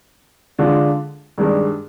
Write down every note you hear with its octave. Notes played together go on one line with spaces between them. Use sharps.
D3 G#3 D4 F4
G2 D#3 G#3 D4